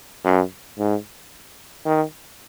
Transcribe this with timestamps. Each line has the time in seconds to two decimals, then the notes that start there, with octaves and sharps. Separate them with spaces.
0.25 F#2
0.79 G#2
1.85 D#3